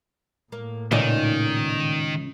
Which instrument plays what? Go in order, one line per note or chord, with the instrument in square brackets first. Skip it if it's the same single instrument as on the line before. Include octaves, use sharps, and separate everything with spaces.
[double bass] A2 [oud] A#3
[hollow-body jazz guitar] C#2 [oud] A#2 D#4 D5 [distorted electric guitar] D#3